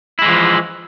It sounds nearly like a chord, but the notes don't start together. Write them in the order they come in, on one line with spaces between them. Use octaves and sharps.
E4 G#3 E3 F3